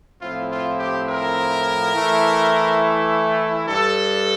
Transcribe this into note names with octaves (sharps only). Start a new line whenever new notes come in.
A2 F3 C4 E4 F4
F4
G4
A#4
E3 A3 E4
G2 A4